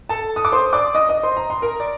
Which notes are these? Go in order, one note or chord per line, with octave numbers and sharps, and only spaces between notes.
A4 A5
D#6
D6
C5 C6
D5 D6
D#5 D#6
D#5 D#6
C5 C6
A#5
C6
A#4 A#5
D5